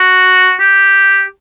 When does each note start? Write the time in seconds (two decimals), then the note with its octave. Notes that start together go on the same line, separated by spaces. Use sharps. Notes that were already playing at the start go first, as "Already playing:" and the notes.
Already playing: F#4
0.60 G4